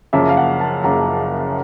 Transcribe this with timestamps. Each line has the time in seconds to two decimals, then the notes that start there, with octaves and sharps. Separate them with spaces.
0.13 F#1 F#2 C#3 F3 A#3 E5
0.29 F5
0.37 F#5
0.61 A5
0.84 F#1 F#2 C#3 F3 A#3 A#5